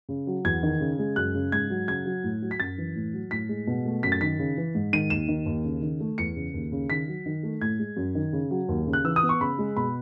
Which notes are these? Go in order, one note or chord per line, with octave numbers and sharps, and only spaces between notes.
C#3
F#3
E2 G#6
D#3
C#3
G#3
F#2 F#6
C#3
G#2 G#6
F#3
C#3 G#6
F#3
A2
F#3
B6
F#2 A6
E3
A2
F#3
A2 B6
G#3
B2
A3
F#2 B6
A6
D#3 B6
C#3
E3
G#2
D#3 D#7
D#2 E7
D#3
D#2
C#3
D#3
A3
E2 C#7
C#3
D#2
C#3
D#3 B6
F#3
D#3
A3
A2 G#6
G#3
F#2
D#3
C#3
F#3
D#2
C#3
F#6
E3 E6
D#6
B3
C#6
C#3 B5
G#3
B2 B5